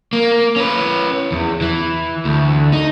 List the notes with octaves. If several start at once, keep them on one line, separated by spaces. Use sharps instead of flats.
A#3
C#4 B4
E2
E3
D2
D#4